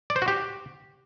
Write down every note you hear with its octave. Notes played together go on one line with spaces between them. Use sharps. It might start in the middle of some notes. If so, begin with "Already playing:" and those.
D5
C5
F#4
G4